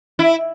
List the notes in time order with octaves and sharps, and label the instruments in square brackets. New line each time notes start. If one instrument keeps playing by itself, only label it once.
[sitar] E4